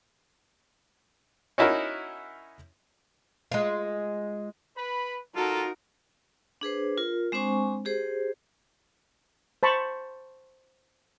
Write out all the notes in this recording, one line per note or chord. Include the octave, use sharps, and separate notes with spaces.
C#4 D#4 E4 F#4 A#4
G#3 F4
B4 B5
D#4 F4 F#4 A4 A#4
D4 G#4 B4 C5
F4 A#4
G#3 C4 D4 C5 G#5 C#6
G4 G#4 C5
C5 A5 B5 C#6